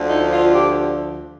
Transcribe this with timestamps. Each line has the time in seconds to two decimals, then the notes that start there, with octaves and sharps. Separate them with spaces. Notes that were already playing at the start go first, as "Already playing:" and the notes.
Already playing: D2 D3 F3
0.08 D#4
0.31 F4
0.53 G4